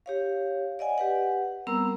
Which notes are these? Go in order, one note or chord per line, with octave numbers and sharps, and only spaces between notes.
G4 C#5 F5
D5 D#5 F#5 G#5
G4 B4 F#5
G3 B3 C4 A#4 A#5 E6